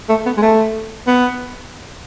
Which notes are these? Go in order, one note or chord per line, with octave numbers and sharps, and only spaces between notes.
A3
B3
G#3
A3
B3